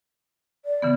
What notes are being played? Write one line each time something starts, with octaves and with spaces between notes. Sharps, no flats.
D5
C#3 E3 B3